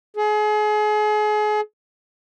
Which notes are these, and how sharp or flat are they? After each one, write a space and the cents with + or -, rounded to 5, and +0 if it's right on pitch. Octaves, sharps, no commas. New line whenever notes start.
G#4 +35